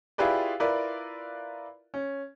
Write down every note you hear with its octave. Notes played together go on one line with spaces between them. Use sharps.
E4 F4 G4 G#4 B4 D5
E4 F4 A#4 B4 D5
C#4